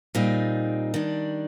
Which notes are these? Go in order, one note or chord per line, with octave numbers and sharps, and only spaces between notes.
A#2 G3 C4 D#4
D#3 G3 D4